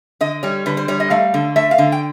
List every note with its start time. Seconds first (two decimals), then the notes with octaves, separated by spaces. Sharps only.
0.21 D3 D#5
0.43 G3 C#5
0.66 D3 B4
0.77 C5
0.88 G3 C#5
1.00 D#5
1.10 A3 F5
1.34 D3
1.56 A3 E5
1.71 F5
1.78 D3
1.92 G5